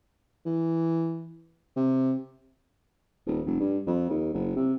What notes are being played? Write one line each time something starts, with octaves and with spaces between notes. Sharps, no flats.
E3
C3
D#1
F1
G2
F2
D#2
F#1
C3